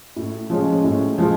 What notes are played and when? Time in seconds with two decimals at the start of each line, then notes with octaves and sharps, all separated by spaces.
0.16 A2
0.50 F3 G#3 C#4
0.84 A2
1.18 F3 G#3